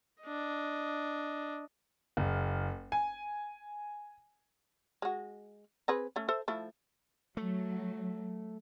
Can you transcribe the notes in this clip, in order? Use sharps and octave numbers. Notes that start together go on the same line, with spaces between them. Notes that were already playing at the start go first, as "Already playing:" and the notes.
D4 D#5
F#1
G#5
G#3 F#4
C4 G#4 B4
A3 C#4
A4 C5 E5
F3 A3 E4
F#3 A3